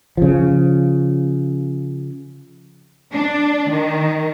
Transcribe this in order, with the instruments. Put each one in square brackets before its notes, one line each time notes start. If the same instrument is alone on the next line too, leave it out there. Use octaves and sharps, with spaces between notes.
[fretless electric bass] C#3 F3
[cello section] D4
D#3